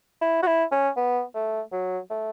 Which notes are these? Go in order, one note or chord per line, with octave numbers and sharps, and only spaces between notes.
E4
F#4
E4
C#4
B3
A3
F#3
A3